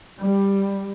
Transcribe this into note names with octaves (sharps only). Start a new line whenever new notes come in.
G3